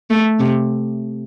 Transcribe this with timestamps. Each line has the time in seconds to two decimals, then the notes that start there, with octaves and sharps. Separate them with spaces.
0.10 A3
0.39 C3